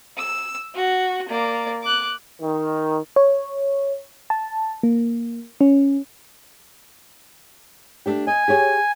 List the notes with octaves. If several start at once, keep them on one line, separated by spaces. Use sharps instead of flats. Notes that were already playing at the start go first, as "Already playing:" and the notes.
E6
F#4
A#3 D5
D6 F#6
D#3
C#5
A5
A#3
C#4
A3 D4 G4
D#5 G#5
G4 G#4 C#5